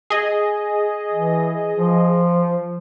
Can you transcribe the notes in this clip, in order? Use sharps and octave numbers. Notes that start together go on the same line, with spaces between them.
G#4 D#5
E3
F3